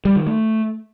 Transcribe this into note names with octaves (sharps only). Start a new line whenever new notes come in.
G3
D#3
A3